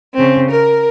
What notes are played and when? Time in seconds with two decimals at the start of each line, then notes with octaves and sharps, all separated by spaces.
0.14 C#3 C4
0.50 A#4